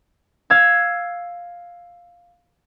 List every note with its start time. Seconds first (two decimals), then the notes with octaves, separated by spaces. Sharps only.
0.50 F5 E6 G#6